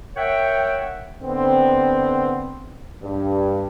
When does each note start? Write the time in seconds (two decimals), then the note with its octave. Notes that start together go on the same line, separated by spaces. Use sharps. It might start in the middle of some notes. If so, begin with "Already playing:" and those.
0.16 A#4 C#5 E5 F#5 G5
1.23 D3 B3 C4
3.03 G2